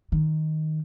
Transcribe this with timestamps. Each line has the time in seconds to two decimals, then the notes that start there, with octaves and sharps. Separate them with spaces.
0.12 D#3